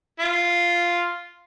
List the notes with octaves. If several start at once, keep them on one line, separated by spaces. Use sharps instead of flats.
F4